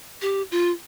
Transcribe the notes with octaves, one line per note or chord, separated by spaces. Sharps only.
G4
F4